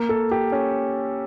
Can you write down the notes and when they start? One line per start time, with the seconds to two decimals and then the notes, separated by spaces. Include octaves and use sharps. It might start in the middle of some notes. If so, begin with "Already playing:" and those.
Already playing: A#3
0.09 A4
0.31 G4
0.52 C#4